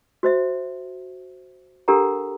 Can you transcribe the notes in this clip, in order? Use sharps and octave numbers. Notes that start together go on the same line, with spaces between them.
F#4 C5 E5
D4 G4 A4 A#4 F#5 A#5